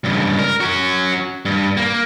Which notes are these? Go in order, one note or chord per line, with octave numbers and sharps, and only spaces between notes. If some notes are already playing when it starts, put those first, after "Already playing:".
C#2 G2
A#4
C#4 F#4
G2
A#3